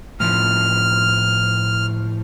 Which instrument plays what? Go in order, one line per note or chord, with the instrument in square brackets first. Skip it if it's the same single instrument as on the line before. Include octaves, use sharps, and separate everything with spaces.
[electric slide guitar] A2 F3 [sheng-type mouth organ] F6